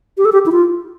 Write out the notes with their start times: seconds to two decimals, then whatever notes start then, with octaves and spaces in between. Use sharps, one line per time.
0.18 G4
0.25 A4
0.32 G4
0.46 E4
0.52 F4